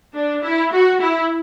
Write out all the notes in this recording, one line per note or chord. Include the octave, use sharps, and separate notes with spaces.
D4
E4
F#4
E4